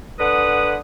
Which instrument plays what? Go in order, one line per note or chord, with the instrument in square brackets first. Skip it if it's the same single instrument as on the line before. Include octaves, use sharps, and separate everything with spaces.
[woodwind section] D3 B4 F#5 D#6